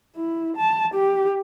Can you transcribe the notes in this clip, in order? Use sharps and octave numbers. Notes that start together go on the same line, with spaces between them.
E4
A5
G4